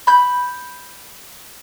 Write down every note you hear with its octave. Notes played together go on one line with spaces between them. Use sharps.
B5 G6